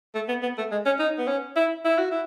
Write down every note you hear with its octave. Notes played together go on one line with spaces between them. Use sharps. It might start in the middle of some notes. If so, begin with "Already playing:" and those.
A3
B3
B3
A3
G#3
C#4
D#4
B3
C#4
E4
E4
F#4
E4